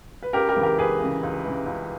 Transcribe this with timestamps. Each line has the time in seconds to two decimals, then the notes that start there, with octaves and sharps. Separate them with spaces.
0.23 B4
0.33 C#2 G4 A#4
0.49 G4 A#4
0.57 C#3 E3
0.63 G4 A#4
0.78 C#2 G#4 B4
1.00 C#3 E3
1.23 C#2
1.45 C#3 E3
1.66 C#2